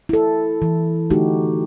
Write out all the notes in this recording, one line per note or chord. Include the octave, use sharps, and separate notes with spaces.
E4 A4
E3
D3 A3 D#4 F#4 G4